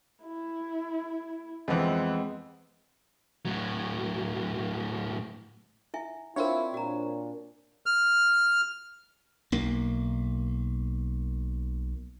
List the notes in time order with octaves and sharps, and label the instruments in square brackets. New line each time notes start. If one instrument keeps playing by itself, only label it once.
[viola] E4
[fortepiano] F2 E3 [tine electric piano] G#3 B3 C4
[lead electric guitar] A2 F#3
[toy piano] E4 E5 G#5
[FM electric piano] C4 F4 C#5 [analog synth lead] D4 [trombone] E4 [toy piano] A#4 F5
[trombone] A#2 [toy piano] F#4 A#5
[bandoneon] F6
[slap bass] B1 A#3